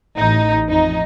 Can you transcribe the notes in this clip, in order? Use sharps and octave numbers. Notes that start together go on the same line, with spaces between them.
A1 D#4
F2 D#4